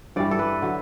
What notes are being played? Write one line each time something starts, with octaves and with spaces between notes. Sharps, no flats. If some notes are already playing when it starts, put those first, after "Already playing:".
G2 E3 G3 D5
A4
B4
D3 F#3